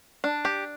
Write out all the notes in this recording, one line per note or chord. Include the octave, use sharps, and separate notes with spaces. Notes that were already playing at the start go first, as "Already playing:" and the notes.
D4
G4